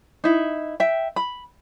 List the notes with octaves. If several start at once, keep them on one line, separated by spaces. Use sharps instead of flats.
D#4 E4
E5 G5
B5